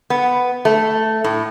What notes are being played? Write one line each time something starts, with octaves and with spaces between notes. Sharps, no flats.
B3
A3
A2